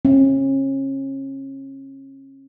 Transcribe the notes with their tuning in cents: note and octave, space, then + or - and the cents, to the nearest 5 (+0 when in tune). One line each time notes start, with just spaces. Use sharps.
C#4 -35